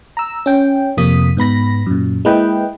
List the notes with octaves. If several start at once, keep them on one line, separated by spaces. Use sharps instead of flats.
A#5 E6
C#4 G5
F2 C3 A#3 D#6 B6
G#2 B3 B5 A#6
F#2 A#2
G#3 A#3 E4 B4 D#5 G5